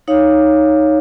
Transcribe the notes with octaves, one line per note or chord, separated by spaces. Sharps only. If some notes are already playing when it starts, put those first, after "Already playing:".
D#4 C#5 F5